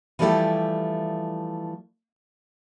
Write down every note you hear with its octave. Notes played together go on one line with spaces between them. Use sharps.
E3 F3 G3 A3 E4 G4